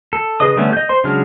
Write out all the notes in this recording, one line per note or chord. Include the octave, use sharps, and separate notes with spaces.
A4
C#3 G#4 B4 D#5 D#6
D3 G3 A3 B3 C#4
D#5 G6
C5 C6
C#3 F#3 G#3 D4 F6